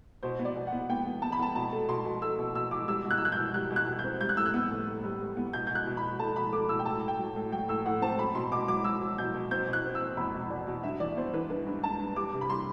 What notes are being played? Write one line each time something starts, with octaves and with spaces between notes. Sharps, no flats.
B2 C5
B3
D5
B2
F#5
B3
B3 G5
B3
B3 A5
B5
B3 A5
B2 A5
A3
B2 C6
B2
A3 E6
B2
B2 E6
B2 D6
G3 E6
B2
F#6
E6
B2 F#6
G6
B2
G3 F#6
B2
F#6
B2
G6
C4
G3 G6
F#6
A2 E6
F#6
B3
A2
A2
G3
G3
B3
B2 G6
G6
B2
F#6
B2
B5
B2
A3 A5
B2 B5
A3 D6
B2 E6
G5
A2 A5
A2
G5
F#3
A2
F#3 G5
A2 E6
A2 F#5
C4 A5
F#3 B5
B2 C6
B2 D6
F#3 D6
F#3 E6
F#3
B2 G6
B2
C4 G6
B2
F#6
C4
E6
C4
E2 B5
B2
B2 D5
B2
G2 E5
E3 D5
B3 C5
E3 B4
G2 B4
G2
G2 A5
G2
G3 D6
C3
B5
G3 C6